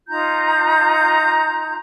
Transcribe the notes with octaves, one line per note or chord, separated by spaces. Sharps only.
D#4 F4 A#5 G6